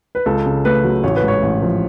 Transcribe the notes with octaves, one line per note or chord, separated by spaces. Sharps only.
B4
C#2 A4
C#3
A3 B4
F#3
A1 C#5
B4
G#2
C#5
A1
F3